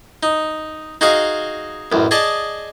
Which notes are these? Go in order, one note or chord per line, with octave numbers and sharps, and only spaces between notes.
D#4
D#4 F#4 G#4 D#5 F5 G#5
A1 F#2
G#4 D5 D#5 A5